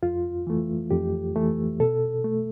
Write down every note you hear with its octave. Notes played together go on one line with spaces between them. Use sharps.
F2 F4
E3 A3
F2 G4
E3 A3
B2 A4
A3